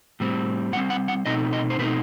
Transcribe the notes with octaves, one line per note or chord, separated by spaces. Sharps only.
A2 G3 C4
A2 G3 C4 F#5
F#5
F#5
B2 A3 C4 D#4 D#5
D#5
C5
B2 A3 C4 D#4 B4